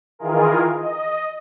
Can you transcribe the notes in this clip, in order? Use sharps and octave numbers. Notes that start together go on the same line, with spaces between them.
D#3 E3 F4 G#4 A#4
D#5